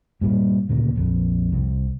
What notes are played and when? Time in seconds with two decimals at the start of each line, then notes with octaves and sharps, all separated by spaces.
0.21 G2 A#2 G3
0.69 D2 A#2 C#3 A#3
0.96 A#1 F2
1.52 C2